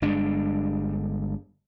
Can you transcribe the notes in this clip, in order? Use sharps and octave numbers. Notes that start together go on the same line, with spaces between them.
G1 G2 G#3 D4